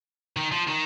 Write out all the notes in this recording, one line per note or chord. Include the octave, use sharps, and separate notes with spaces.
D#3
F3
D#3